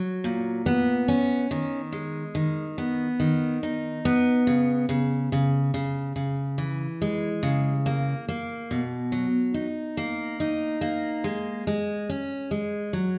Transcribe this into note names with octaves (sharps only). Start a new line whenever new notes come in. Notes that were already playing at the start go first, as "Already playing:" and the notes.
Already playing: F#3
A#2
B3
C#4
D#3
G#3
D#3
B3
D#3
D#4
B3
C#3
C#3
C#3
C#3
C#3
E3
G#3
C#3
A#3
A#3
B2
F#3
D#4
A#3
D#4
A#3
G#3
G#3
C#4
G#3
F#3